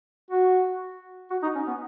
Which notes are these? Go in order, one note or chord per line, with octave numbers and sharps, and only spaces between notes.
F#4
F#4
D#4
C#4
B3